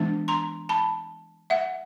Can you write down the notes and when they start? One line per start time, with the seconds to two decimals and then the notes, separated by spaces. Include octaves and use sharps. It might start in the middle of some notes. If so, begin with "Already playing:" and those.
Already playing: E3 G#3 B3 D4
0.28 A#5 C6
0.69 A5 B5
1.50 E5 F#5